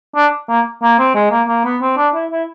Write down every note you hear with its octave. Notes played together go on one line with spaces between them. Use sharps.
D4
A#3
A#3
C4
G#3
A#3
A#3
B3
C4
D4
E4
E4